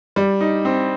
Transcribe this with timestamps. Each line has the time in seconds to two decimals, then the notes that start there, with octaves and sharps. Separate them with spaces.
0.16 G3
0.41 D#4
0.65 C4